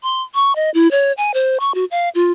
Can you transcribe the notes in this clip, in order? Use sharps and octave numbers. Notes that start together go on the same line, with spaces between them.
C6
C#6
D#5
E4
C#5
G#5
C5
C#6
F#4
F5
F4